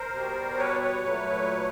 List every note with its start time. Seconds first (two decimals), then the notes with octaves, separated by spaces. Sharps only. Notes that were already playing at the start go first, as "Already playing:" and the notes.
Already playing: A#4 C5
0.12 B2 G3
0.58 B4 C#5
0.81 B4 C#5
1.04 A#2 F#3 A3